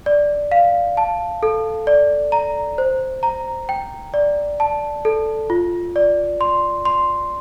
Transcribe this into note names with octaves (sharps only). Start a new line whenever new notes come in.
D5
F5
A5
A4
D5
A#5
C5
A#5
G5
D5
A5
A4
F4
D5
C6
C6